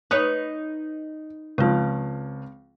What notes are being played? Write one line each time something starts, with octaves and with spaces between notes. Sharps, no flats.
D#4 B4 C#5 F#6
C#2 F3 G#3 C4